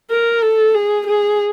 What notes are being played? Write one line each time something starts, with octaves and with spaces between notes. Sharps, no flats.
A#4
A4
G#4
G#4